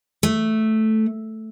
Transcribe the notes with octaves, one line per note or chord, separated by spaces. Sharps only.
A3